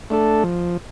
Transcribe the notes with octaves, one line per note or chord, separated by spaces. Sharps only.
A3 D4 A4
F3